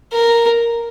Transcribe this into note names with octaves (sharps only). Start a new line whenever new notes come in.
A#4